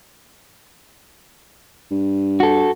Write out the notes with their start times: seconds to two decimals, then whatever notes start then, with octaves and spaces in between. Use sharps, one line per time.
1.91 G2
2.40 F#4 A4